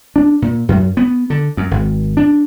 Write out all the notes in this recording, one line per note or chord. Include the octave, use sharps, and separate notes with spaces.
D4
A#2
F#2
B3
D3
F#2
G#1
D4